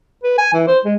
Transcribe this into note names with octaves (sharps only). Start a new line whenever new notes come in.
B4
G#5
E3
C5
G#3